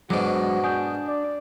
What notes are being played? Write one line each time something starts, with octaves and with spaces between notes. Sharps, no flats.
G#2 B2 F#3 G#3 D4 F#4 C5 D6
D4 G#5 D#6 G6
D5